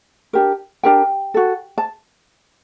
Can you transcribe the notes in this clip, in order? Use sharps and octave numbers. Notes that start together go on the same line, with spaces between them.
D4 G4 A#4
D4 G4 A#4 G5
F#4 A4
A5